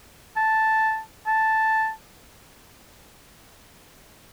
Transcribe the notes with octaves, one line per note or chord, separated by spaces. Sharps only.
A5
A5